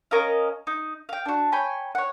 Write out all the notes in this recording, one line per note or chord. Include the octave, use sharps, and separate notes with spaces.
C#4 A#4 D#5 F5
D#4
F5 G5
D4 F#4
C#5 G5 G#5 B5
C#5 F#5